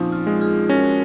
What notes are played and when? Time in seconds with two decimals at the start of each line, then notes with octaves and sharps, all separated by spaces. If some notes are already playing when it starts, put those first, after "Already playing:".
Already playing: A#2 F3 C4 C#4 D#4
0.12 F4
0.27 G#3
0.41 F4 G#4
0.69 C#4 F#4 A#4